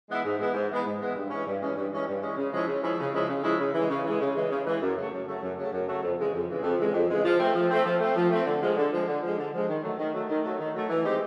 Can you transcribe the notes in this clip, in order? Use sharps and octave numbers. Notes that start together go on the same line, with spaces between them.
E3 G#3 B3 E4
G#2
E3 G#3 B3 E4
G#2
E3 G#3 B3 E4
G#2
E3 G#3 B3 E4
G2
E3 G#3 C#4
G2
E3 G#3 C#4
G2
E3 G#3 C#4
G2
E3 G#3 C#4
C#3
F3 G#3 C#4 E4
C#3
F3 G#3 C#4 E4
C#3
F3 G#3 C#4 E4
C#3
F3 G#3 C#4 E4
C#3
E3 G#3
C#3
E3 G#3
C#3
E3 G#3
C#3
E3 G#3
F#2
C#3 F#3 A3
F#2
C#3 F#3 A3
F#2
C#3 F#3 A3
F#2
C#3 F#3 A3
F2
C#3 E3 G#3
F2
C#3 E3 G#3
F2
C#3 E3 G#3
F2
C#3 E3 G#3
F3
A3 C4
F3
A3 C4
F3
A3 C4
F3
A3 C4
D3
F3 G#3
D3
F3 G#3
D3
F3 G#3
D3
F3 G#3
D#3
F#3 A3
D#3
F#3 A3
D#3
F#3 A3
D#3
F#3 A3
E3
G#3 C4 D#4 G4